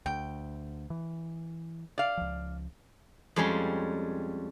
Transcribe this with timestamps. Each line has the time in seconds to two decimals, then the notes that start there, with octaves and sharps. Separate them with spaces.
0.06 D2 G5
0.90 E3
1.98 D5 F5
2.17 C#2 F3
3.36 F2 G3 G#3 C#4 C#5 C6